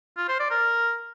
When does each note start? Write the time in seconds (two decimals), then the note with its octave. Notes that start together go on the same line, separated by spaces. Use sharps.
0.17 F4
0.28 C5
0.40 D5
0.51 A#4